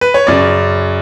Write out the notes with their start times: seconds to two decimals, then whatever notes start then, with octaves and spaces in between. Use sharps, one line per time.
0.01 B4
0.14 C#5
0.27 F#2 C#3 D5